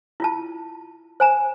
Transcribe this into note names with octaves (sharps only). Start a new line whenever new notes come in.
E4 F4 A5
C5 G#5 A#5